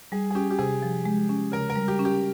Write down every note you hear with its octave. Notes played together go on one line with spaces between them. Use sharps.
G3 G#4
G#4
C#4 G4
G4
C3 G#4
F3
G#3
C#4
C#3 A#4
A#4
G3
G4
C#4
G4